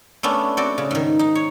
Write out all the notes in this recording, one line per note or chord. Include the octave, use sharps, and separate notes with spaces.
A3 B3 C#4 D4
C4 F#4 D5
C#3
G#2 D#3
D#4
C#5